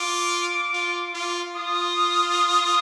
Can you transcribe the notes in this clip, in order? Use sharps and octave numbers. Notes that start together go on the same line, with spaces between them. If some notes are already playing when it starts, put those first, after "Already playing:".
Already playing: F4 D6
F4
F4
F4 D#6